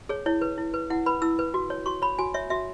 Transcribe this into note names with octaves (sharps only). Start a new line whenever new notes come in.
G#4 C#5
E4 C#5
B4
E4
B4
E4 F#5
B4 B5
E4 E6
B4
F#4
C#5
F#4 C#6
C#5 B5
F#4 G#5
C#5 E5
F#4 E5